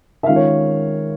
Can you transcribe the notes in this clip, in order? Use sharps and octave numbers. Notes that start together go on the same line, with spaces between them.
E5
D#3 G#3 C#4 F4 F5
C#5